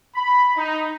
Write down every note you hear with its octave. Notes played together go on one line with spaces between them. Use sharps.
B5
D#4